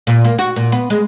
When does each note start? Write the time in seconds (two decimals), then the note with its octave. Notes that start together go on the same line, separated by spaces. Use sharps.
0.07 A#2
0.25 A#3
0.38 F#4
0.56 A#2
0.72 B3
0.90 G#3